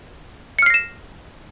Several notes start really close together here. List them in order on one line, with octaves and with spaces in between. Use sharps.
C#7 F6 C7 A#6 E7